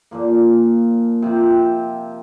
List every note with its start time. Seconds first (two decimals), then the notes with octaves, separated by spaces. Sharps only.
0.11 A#2 F3 A#3
1.22 C3 F3 C4